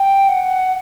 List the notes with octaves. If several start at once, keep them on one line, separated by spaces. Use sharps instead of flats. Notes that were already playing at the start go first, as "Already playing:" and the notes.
Already playing: G5
F#5